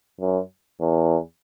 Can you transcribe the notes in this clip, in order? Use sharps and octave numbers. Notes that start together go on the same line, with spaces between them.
F#2
E2